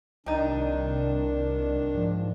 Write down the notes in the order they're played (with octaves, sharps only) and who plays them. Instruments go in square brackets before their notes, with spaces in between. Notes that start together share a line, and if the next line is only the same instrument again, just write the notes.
[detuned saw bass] C2 [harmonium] D#3 D4 [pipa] G3 D#4
[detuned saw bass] G#2 [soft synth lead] F3